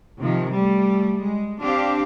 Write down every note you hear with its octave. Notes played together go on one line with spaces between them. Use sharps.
C3 D#3 F3
G3 A3
G#3
C4 D4 G4 F5